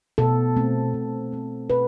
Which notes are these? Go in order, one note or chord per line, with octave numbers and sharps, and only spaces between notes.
B2 A4
A3 C4
B2
A3 C4
B2 B4